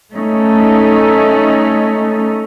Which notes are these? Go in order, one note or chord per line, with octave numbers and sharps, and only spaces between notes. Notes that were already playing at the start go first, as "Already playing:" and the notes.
A3 C#4 D#4